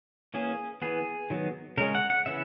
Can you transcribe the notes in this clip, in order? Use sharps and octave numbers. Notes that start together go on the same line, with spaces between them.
E3 A#3 C#4 G#4
E3 B3 G#4
D#3 F#3 B3
C#3 G#3 C#4 A#4
F#5
F#5
C#3 E3 B3 E5